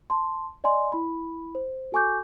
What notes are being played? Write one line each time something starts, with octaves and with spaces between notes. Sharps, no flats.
A5 C6
D5 D#5 G#5 C6
E4 B5
C5
F#4 A4 G#5 C#6 D6 G6